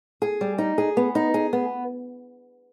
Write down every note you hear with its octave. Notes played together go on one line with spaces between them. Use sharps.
G#4
G3
D#4
G#4
B3
D#4
G#4
B3